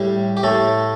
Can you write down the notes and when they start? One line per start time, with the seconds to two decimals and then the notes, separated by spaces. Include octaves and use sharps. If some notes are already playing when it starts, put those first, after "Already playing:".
Already playing: A2 G3 G4
0.37 G4
0.43 A2 A3 A4